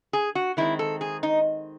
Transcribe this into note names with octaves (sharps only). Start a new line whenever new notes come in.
G#4
F#4
D#3 G#3 C4 E4
A4
G#4
D#4